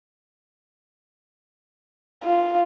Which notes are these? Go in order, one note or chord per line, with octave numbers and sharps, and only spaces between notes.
F4